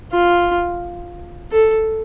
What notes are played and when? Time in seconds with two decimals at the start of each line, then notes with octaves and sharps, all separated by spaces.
0.13 F4
1.52 A4